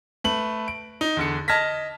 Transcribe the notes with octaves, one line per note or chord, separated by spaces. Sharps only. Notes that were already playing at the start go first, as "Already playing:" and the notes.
A3 B4 F#7
D7
D#4
E2 D3 C#7
D#5 A5 F6 G#6 A#6 B6